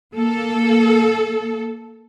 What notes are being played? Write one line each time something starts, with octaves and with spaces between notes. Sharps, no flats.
A#3 A4